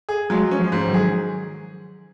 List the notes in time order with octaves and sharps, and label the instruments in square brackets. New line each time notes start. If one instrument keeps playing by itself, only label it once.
[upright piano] G#4
[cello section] F3 G#3 [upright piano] F#3
[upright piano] C#4
[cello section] F3 G#3
[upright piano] G#2
[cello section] D#3 F#3
[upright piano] G#4